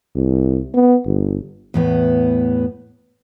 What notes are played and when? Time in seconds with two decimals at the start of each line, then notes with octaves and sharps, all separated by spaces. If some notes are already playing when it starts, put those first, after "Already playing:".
0.15 C2
0.74 B3
1.06 G1
1.74 E2 A2 B3